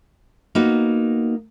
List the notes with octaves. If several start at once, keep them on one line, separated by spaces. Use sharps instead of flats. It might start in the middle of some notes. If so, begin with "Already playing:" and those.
A#3 B3 D#4 F#4